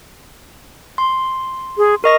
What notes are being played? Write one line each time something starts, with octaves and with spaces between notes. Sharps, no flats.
C6
G#4
A#4 D#5 C#6 A#6